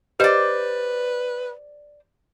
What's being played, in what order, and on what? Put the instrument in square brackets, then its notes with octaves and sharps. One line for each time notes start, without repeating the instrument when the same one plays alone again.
[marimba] G4 D#5 [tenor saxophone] B4 [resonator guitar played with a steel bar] C5 D5